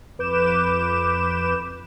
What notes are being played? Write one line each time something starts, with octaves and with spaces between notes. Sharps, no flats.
F2 B4 D6 G6 E7